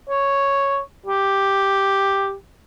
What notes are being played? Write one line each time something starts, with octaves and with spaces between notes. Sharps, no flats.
C#5
G4